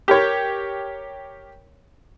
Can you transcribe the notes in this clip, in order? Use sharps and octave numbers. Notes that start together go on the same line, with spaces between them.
G4 A#4 C#5